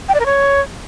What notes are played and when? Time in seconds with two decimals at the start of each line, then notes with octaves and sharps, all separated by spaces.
0.09 G5
0.14 D5
0.20 A#4
0.26 C#5